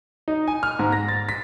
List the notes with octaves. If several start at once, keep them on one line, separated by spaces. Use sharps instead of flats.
D#4
G#5
F6
G#2
A#6
A6
B6